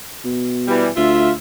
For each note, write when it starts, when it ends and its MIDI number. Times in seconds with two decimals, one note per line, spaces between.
0.24 0.91 47
0.68 0.88 52
0.68 0.88 55
0.97 1.33 38
0.97 1.32 65
0.97 1.32 76